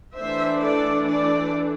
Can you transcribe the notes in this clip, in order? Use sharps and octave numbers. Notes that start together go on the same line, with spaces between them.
E3 A3 D4 C5 E5
A4 D5
A4 D5